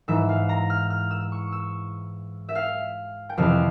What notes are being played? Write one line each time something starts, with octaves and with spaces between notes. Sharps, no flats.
G#2 E3 E5
F5
A#5
F6
F6
E6
C#6
E6
E5
F5
G5
F2 C3 E3 F5